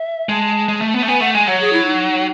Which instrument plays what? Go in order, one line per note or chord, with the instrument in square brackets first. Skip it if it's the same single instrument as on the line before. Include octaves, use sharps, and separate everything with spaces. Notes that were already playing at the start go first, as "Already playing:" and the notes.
Already playing: [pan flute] E5
[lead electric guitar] G#3 [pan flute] A5
[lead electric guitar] G#3
A3
B3
A3
[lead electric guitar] B3 [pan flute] G#5
[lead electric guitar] A3 [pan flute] F#5
[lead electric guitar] G#3 [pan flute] G#5
[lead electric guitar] F#3 [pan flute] F#5
[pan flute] G#4
E4
D#4